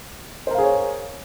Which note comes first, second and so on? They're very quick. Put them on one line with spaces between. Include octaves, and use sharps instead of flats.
C5 A#4 F5 G#4 C#5